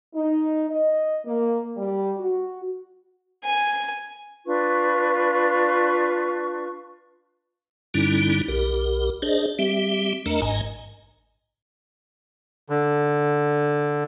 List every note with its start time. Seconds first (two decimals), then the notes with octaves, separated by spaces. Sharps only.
0.14 D#4
0.70 D#5
1.26 A#3
1.77 G3
2.18 F#4
3.45 G#5
4.46 D4 F4 B4 C#6
7.94 G2 D3 G3 C#4 D#4 E4
8.48 B1 G4 A#4
9.22 D4 G#4 C5 D5 D#5
9.59 G3 C4 G4 E5
10.26 E2 A3 D4 A#4 D#5 A#5
10.42 G#1 G#2 D#5 G#5 A#5
12.70 D3